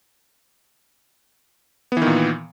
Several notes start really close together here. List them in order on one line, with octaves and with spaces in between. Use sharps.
B3 E3 D#3 A#2